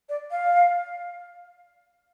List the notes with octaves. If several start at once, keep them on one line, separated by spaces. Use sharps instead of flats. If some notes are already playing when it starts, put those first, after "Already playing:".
D5
F5